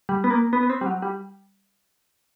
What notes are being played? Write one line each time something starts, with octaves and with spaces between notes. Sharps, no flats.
G3
B3
A#3
B3
B3
C4
G3
F#3
G3